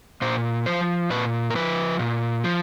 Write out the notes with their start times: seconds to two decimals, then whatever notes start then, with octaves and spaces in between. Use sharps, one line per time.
0.22 A#2 C5
0.66 F3 C5
1.10 A#2 B4
1.50 A#4
1.55 F3 B4
1.99 A#2
2.44 F3